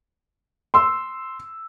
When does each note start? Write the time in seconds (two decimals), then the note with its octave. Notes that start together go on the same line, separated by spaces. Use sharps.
0.74 C6 E6